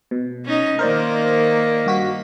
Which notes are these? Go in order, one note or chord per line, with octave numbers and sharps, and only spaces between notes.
B2
C#4 D#4
D#3 A#3 A#4 C5 D5
G2 F#4 B6